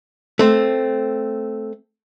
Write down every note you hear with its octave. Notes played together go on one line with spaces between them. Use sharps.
A3 C4